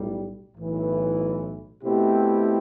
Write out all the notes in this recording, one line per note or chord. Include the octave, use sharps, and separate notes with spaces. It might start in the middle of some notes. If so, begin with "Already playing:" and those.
Already playing: B1 A2 G3
B1 A2 E3
B2 A3 C4 E4 G4